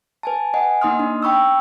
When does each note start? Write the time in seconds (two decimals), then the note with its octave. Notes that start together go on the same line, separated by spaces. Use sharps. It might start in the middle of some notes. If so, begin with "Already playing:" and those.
0.23 B4 G#5 A5
0.54 D#5 F#5 G#5
0.81 A#3 D#4 D#5 C6 D#6 F6
0.99 D4
1.23 G5 B5 C#6 E6